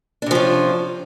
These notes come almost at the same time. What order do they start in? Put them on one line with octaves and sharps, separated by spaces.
D4 C3 F3 C#4